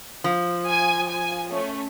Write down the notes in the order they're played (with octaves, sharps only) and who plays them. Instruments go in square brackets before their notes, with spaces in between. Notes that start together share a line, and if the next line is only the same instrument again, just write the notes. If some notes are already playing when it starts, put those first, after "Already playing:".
[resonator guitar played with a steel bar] F3
[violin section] G#5
G#5
A3 C#4